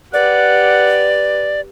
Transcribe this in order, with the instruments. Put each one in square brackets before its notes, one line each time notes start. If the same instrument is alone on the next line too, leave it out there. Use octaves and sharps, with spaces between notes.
[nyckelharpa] G4 B4 [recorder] D5 [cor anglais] F#5